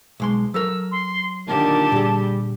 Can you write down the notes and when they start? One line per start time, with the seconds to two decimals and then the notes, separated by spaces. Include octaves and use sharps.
0.20 B1 G#3 C6
0.54 F#3 A4 A#4 E6
0.91 C6
1.48 A#2 D3 D#3 G4 A5
1.92 A#2 G3 G#4